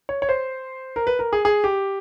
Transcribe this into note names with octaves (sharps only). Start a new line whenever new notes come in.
C#5
C#5
C5
A#4
B4
A#4
G#4
G#4
G4